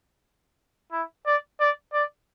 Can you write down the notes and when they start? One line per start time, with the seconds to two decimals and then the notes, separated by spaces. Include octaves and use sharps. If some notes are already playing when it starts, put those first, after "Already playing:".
0.92 E4
1.26 D5
1.60 D5
1.93 D5